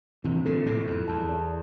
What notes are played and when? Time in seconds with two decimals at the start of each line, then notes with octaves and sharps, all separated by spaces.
0.24 C3 E3 C4
0.45 A#2 D3 A4
0.66 A2 C3 E4
0.87 F2 A4
1.08 E2 A5
1.29 D5